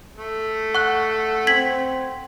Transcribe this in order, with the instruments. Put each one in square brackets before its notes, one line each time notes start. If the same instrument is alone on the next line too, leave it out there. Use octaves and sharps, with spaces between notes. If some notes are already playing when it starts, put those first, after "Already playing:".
[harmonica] A3
[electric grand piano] F#5 [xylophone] C#6 F#6
[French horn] C4 [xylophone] G#6 B6 F#7